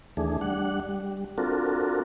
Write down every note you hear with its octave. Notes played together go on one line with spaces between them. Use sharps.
D#2 E3 A3 D4 G#4
G3 D4 F#5
G3
C4 D4 F4 F#4 A4 A#4